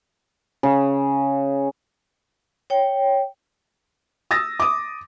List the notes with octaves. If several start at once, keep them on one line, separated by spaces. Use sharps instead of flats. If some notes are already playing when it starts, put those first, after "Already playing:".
C#3
C#5 G5
D#6 E6 A6 A#6
D6 D#6